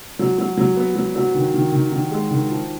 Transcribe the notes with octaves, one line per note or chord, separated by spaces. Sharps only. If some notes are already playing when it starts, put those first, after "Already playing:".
F#3
F#3
F#3
B3
F#3
F#3
D#3
D#3
D#3
D#3
G#3
D#3
F3